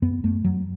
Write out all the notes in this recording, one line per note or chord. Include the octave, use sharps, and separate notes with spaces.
F#2 B3
F#2 A3
F#2 F#3